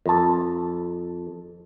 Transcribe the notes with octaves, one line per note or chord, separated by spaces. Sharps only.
F2 A5